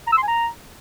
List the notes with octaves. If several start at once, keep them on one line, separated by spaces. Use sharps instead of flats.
A#5
E6
C6
G#5
A#5